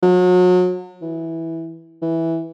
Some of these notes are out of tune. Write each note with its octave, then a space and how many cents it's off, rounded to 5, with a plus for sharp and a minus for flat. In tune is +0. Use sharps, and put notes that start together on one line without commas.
F#3 -35
E3 -10
E3 -5